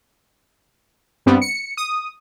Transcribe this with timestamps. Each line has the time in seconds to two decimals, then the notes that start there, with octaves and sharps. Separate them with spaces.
1.26 G2 G3 B3 C4
1.42 C#7
1.77 D#6